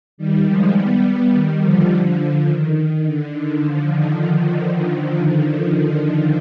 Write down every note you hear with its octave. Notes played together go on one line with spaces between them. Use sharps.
D#3 G3
F3 G#3
G3 B3
D#3 G3
D3 F3
D#3
D#3
D3
D#3
D3 F3
D#3